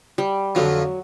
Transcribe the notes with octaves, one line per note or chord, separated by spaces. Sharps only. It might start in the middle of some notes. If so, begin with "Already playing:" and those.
G3
F2 D3 F3 F#3